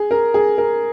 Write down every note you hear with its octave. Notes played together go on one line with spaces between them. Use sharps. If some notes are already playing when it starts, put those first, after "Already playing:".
Already playing: G#4
A#4
G#4
A#4